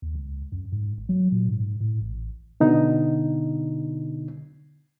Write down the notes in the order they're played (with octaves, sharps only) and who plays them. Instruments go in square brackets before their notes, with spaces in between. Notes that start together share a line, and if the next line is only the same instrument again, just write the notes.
[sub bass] D#2
C#2
F#2
G#2
G1
F#3
A#2
G#2
A2
A1
[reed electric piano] B2 D3 D#4